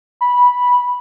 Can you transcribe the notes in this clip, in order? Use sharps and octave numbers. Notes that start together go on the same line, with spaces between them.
B5